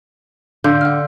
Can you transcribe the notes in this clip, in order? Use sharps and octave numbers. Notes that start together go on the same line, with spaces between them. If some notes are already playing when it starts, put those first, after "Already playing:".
D3 F5 C6 G6
F#5 F6